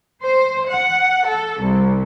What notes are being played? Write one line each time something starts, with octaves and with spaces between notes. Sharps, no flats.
C5
F#5
A4
C2